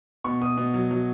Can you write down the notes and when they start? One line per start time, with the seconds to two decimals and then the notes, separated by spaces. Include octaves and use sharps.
0.24 B2 C#6
0.41 B2 D#6
0.58 B2
0.74 F#3
0.91 F#3